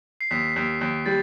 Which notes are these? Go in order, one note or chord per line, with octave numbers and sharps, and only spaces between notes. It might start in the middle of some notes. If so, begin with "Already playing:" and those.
C7
D#2 B6
D#2
D#2
G3 A6